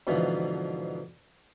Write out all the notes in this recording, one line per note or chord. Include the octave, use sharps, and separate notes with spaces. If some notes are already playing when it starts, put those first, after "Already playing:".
G#2 B2 D3 E3 F3